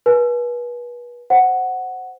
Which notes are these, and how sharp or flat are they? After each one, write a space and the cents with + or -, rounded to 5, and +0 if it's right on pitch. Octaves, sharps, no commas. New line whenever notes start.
B4 -35 G#5 +35
C5 +0 F#5 +0